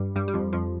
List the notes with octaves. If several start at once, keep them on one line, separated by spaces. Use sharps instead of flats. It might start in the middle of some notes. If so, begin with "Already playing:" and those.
Already playing: G2 G3
G2 G3
G3
F2 F3
F2 F3